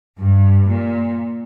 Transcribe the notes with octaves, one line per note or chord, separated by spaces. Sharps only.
G2
A#2